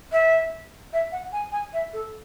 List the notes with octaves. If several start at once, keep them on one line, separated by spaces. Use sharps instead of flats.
E5
E5
F#5
G#5
G#5
E5
A4